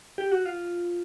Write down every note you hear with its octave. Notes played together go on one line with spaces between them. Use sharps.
G4
F#4
F4